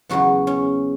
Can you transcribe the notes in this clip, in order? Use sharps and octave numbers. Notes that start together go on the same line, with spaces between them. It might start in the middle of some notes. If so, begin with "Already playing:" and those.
E2 C#3 F#3 B3 F#4
C#4